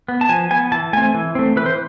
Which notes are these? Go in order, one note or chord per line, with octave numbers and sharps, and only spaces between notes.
B3
A5
F3 G#5
B3 G#5
E3 A5
A3 C4 G#5
E3
A3 C4
E3 B4
C5